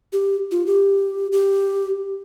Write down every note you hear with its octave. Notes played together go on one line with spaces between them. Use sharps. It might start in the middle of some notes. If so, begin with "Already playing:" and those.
G4
F4
G4
G4